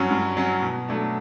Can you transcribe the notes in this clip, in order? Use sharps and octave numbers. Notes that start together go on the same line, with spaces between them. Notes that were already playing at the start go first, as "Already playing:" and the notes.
Already playing: G2 F#3 C#4
G2
F#3 C#4
B2
F#3 A3 D4